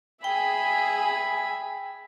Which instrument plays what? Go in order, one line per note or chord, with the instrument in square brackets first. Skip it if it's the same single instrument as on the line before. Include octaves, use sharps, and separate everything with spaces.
[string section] G#4 [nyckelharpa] E5 B5 [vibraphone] G5